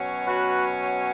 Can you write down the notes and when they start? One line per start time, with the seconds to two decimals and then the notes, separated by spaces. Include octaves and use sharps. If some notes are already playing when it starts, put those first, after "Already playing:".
Already playing: B2 F#3 C#4
0.27 F#4 B4